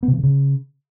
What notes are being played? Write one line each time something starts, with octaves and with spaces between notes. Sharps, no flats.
B3
C3
E3
D3
C#3